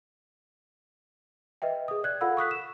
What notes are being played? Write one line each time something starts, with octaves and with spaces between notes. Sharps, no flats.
B4 D#5 E5 G5
G#4 D#6
D5 F#6 G#6
F4 A4 F5 F#5 B5 E6
C#6 D#6 F#6 B6
E7